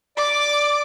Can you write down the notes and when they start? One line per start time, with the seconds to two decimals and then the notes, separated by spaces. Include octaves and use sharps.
0.18 D5 D6